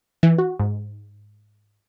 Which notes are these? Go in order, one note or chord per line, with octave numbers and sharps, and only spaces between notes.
E3
F#4
G#2